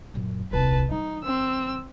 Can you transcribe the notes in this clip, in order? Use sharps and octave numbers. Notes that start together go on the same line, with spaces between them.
F#2 A#2
D#1 C2 B4 A5
E3 G3 D#4
C4 E6